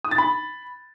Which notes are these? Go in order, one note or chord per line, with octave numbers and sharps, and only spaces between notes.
D#6
A6
B5